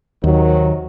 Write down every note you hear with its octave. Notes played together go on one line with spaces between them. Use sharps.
D#2 C3 D#3 F#3